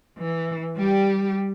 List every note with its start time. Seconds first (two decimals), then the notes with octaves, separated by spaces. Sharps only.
0.18 E3
0.76 G3 G4